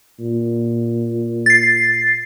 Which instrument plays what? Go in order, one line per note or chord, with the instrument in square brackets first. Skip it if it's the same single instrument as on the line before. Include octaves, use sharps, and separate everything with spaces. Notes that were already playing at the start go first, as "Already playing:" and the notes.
[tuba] A#2
[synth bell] A6 C7